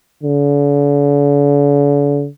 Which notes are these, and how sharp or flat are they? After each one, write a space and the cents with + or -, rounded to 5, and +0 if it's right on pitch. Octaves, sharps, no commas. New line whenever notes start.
D3 -45